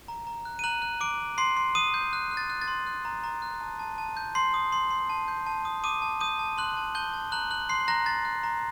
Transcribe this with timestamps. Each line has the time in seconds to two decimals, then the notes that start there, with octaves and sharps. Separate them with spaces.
0.08 A#5
0.27 A#5
0.45 F#6
0.59 D#7
0.64 A#5 F#6 F#7
0.82 F#6
1.01 D6 D7
1.19 D6
1.38 C6 C7
1.57 C6
1.75 C6 D#6 D#7
1.94 G6
2.13 F#6
2.31 F#6
2.37 A6
2.50 F#6
2.61 A6
2.68 C6
2.86 F#6
3.05 A#5
3.24 A#5
3.42 F#6
3.61 A5
3.79 A5
3.98 A5
4.17 G6
4.35 C6 C7
4.54 D#6
4.72 C6
4.91 C6
5.10 A5
5.28 G6
5.47 A5
5.65 D#6
5.84 D6 D#6 D#7
6.02 A5
6.21 D#6 G6 D#7
6.39 A5
6.58 C6 F#6 F#7
6.77 A5
6.95 A5 G6 G7
7.14 A5
7.32 A#5 F#6 F#7
7.51 F#6 F#7
7.69 C6 F#6 C7
7.88 A#5 F#6 A#6
8.06 A#5 A6
8.25 F#6
8.43 A#5